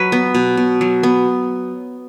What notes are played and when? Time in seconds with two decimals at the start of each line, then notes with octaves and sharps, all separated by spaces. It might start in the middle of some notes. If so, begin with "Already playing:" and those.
Already playing: F#3 B4
0.12 B3
0.35 B2
0.57 B2
0.81 F#3
1.03 B3